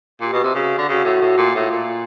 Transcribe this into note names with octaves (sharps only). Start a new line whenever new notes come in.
A#2 G4
B2
C3
C#3 F#4
D3
C#3 F#4
A2
A2
A#2
A2 F4
A#2